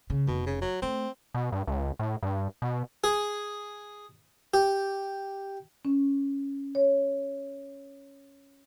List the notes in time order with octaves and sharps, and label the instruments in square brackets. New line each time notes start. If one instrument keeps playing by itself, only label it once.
[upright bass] C#3
[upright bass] F1 [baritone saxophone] B2
[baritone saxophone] C#3
F#3
[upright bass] A3 [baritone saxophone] C4
[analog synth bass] B2
G2
C#2
A2
G2
B2
[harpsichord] G#4
G4
[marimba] C#4
C#5